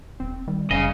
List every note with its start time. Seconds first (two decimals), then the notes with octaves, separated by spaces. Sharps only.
0.20 D#1 C4
0.48 D#3 G3
0.71 F1 C#3 D#5